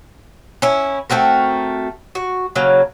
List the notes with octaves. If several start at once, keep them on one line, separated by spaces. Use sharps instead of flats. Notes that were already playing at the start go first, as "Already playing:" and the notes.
C#4 E4
A3 C4 F#4 A#4
F#4
C#3 F#3 A#3